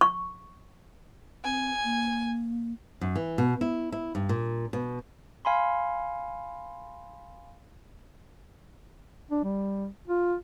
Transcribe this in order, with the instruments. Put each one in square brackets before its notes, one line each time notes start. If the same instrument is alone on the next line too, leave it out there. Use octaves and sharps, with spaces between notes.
[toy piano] C#6
[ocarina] C4 [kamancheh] G#5
[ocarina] A#3
[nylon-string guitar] F#2
E3
B2
E4
E4
G2
A#2
B2
[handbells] F5 G#5 B5 C6
[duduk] D4
G3
F4